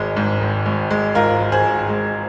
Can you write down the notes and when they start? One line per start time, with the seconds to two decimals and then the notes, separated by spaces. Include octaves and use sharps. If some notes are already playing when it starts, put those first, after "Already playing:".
Already playing: G#1 G#3
0.17 G#2
0.41 G#1
0.66 G#1
0.90 G#3
1.15 G#2 F4 A#4
1.40 G#1
1.52 G#4 C5
1.65 G#1
1.89 G#3